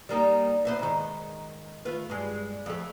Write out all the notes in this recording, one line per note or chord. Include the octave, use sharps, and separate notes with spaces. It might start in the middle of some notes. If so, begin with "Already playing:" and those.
G3 A#3 D#4
B3 C5 E5
G#2 D#3
A3 F4 B4
G2 G#3
F2 A3